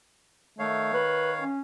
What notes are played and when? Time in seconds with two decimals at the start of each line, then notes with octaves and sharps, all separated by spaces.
0.59 D#3 A3 C#5 F5
0.94 B4
1.40 C#4